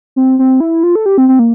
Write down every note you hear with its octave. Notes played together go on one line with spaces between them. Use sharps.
C4
C4
E4
F4
A4
G4
C4
C4
A#3